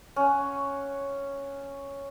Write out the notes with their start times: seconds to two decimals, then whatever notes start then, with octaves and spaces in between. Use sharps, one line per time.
0.16 C#4 F#5